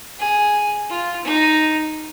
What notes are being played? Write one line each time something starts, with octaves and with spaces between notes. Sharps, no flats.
G#4
F4
D#4